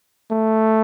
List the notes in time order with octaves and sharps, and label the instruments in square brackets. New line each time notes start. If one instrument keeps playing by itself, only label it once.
[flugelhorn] A3